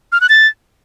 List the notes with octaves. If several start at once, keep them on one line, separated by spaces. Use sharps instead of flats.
F6
F#6
A6